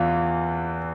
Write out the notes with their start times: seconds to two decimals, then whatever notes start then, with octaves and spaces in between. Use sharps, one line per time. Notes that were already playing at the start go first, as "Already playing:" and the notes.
Already playing: E2 E3 F4